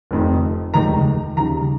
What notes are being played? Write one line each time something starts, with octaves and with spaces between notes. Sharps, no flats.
F1 F2 D#3
F1 D#2 D#3 G#3 A#5
D#2 C#3 G3 A#5